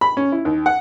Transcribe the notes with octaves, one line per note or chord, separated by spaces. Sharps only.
B5
C#4
E4
D#2
F#5